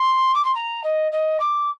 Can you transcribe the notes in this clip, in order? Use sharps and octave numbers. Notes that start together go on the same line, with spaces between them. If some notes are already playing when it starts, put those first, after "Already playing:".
Already playing: C6
D6
C6
A#5
D#5
D#5
D6